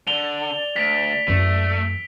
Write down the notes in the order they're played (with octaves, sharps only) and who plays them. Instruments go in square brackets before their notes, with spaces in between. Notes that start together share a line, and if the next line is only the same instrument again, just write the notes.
[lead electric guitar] D3 [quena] D5 [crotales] F7 G7
[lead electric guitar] D2 [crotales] B6 D7
[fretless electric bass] F#2 E3 [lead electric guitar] A3